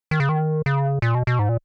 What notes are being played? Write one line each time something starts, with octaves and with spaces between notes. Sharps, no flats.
D#3
C#3
D#3
C#3
A#2
B2
B2
G#2
A#2